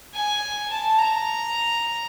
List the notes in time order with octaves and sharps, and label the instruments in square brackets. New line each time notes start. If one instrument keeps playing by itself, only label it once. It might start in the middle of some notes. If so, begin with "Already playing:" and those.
[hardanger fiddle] G#5
A5
A#5